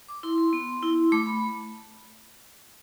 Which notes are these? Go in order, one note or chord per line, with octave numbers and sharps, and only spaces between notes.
D6
E4 C6
C6
B3
E4
A3 D6
B5